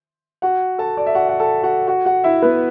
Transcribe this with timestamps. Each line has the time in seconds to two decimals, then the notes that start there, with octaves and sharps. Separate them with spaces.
0.42 F#4 F#5
0.78 A4 A5
0.97 D5
1.07 E5
1.15 F#4 F#5
1.29 F#5
1.39 A4 A5
1.63 F#4 F#5
1.88 F#4 F#5
2.05 F#4 F#5
2.24 E4 E5
2.42 B3 B4